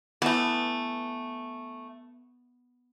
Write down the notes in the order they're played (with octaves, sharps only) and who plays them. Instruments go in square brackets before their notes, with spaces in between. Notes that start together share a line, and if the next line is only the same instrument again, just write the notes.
[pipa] E3 A3 [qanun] B3